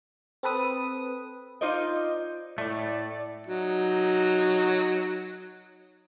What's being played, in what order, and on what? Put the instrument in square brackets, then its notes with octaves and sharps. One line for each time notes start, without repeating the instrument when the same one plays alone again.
[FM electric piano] C4 A4 B4 D#6
[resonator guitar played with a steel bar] D#4 F4 C5 D5 D#5
[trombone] A2 [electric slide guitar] A3 [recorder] D5
[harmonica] F#3 D#4